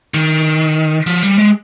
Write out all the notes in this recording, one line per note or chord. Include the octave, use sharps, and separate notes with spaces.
D#3
F3
G3
G#3